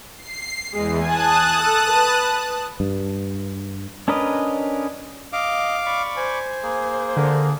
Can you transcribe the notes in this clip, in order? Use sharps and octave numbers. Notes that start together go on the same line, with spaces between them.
C7
E2 G#3
G#5 A5 D#6 F#6
A4
B4
G2
C#4 D4 A#4 B4 D#5
D#5 F5 D6
D5 B5 C#6
C5 G#5
A#3 G#4
D3 A#4